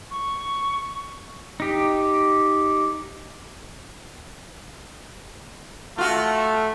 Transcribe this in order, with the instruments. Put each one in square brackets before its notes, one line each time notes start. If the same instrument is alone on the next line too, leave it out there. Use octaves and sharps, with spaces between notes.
[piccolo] C#6
[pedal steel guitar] D#4 G4
[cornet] A3 [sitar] F4 F#4